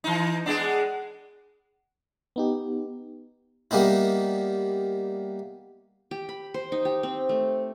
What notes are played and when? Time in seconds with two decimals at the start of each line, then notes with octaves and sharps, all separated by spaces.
0.04 E3 D#4
0.46 G#3 B3 D4
2.36 B3 D#4 G4
3.71 G3 A#3 B3 D#4 E4
6.11 G4
6.29 B5
6.54 C5
6.72 D#4
6.85 G4
7.03 C4
7.29 A3